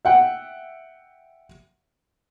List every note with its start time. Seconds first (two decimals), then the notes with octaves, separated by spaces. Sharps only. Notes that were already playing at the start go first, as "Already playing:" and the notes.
0.05 E5 F#5 G5